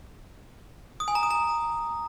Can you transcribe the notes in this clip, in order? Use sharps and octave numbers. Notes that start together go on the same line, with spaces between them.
D#6
G#5
A#5
D#6
A#5